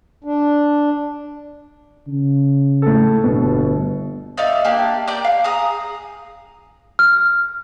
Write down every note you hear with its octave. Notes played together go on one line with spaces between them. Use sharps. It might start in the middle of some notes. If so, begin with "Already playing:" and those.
D4
C#3
A2 A4
G1 B2
D#4 D5 E5 F5
A#3 D4 G4
G4 A#4 D5 G6
F5
G#4 A#5 D#6
F6